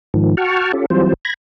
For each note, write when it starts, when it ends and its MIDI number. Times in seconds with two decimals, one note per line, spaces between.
0.14 0.35 44
0.14 0.35 51
0.14 0.35 53
0.37 0.72 66
0.37 0.72 78
0.37 0.72 79
0.37 0.72 81
0.37 0.72 85
0.37 0.72 89
0.73 0.86 61
0.73 0.86 65
0.73 0.86 67
0.73 0.86 69
0.90 1.13 52
0.90 1.13 54
0.90 1.13 55
0.90 1.13 60
0.90 1.13 65
0.90 1.13 72
1.25 1.34 83
1.25 1.34 92
1.25 1.34 94